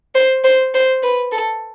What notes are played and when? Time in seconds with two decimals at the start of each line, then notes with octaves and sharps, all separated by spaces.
0.15 C5
0.44 C5
0.74 C5
1.03 B4
1.32 A4